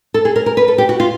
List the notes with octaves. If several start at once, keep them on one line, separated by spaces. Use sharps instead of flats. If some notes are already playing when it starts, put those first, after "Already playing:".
A4
G#4
A#4
A#4
B4
A4
G4
F#4
F4